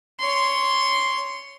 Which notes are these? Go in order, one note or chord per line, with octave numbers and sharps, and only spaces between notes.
C#5 C6